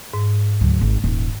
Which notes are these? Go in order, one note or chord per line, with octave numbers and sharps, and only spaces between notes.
G#2
D2 F#3
G#1
D#1